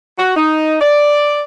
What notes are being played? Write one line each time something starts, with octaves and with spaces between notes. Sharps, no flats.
F#4
D#4
D5